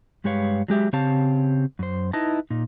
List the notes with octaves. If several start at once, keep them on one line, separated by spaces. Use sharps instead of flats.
G2 G#3 G4 B4 C#5 F5
F#3 G#3 G4 E5
C#3 C4 G4 C#5 F5 A5
F#2 C5
D#4 E4 B4 D#5 A5
A#2 D#4